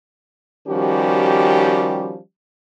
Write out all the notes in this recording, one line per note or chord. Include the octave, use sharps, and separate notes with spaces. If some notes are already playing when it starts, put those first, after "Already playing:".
D#3 F3 G3 C#4 F#4 G4